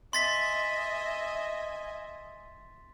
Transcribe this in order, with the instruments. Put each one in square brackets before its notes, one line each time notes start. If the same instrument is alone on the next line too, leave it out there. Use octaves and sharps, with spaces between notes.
[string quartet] D#5 E5 G#5 [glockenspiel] C6 A6 B6